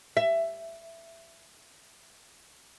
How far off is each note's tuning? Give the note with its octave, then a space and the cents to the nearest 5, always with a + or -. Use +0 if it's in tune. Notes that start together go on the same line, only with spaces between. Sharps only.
E5 +15